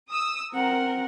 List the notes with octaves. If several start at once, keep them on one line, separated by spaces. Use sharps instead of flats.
D#6 E6
C4 A#4 F#5